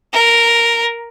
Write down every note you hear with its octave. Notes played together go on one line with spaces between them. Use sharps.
A#4